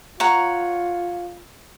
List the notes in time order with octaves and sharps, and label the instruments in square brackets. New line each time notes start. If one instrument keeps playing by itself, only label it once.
[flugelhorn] F4 [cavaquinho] C#5 F#5 A#5